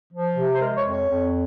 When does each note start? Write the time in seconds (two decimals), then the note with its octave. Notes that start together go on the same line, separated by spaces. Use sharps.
0.13 F3
0.36 C3
0.52 C5
0.60 G#3 A#4
0.76 C#5
0.84 F2
0.92 C#5
1.08 F2